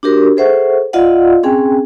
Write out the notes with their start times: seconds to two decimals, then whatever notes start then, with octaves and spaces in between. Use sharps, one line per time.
0.03 D4 F#4 G4 A#4
0.37 G#4 A4 C5 E5 F#5 C#6
0.93 F4 D5 D#5 F5 F#5
1.43 C4 C#4 G#4 G5 G#5